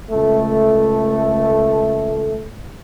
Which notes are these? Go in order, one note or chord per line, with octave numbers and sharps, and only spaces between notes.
C#2 A3